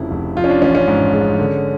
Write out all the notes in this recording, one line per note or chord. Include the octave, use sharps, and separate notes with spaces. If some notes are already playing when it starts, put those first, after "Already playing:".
Already playing: F1 F2 C#3 E4
F1
F3 F4
C#4
D4
A1 C#4
C#4
G#2
G#3
D3